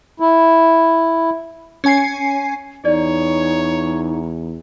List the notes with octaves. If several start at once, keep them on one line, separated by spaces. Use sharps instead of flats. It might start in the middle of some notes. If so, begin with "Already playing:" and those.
E4
C#4 G#5 C7
E2 D#4 C#5 D5